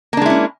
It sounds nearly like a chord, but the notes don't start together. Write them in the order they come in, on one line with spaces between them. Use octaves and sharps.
A#3 D4 G#3 E4 C#4